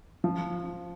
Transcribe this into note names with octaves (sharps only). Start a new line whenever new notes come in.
F3